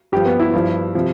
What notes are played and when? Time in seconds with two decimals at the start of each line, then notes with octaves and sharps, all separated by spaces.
0.12 G2 F3 G4
0.26 B3
0.40 E4
0.53 G2 F3
0.95 C3 F3